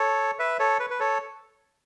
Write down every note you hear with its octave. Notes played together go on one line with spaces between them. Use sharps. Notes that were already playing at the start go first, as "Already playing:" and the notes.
Already playing: A4 C#5
B4 E5
A4 C#5
B4
B4
A4 C#5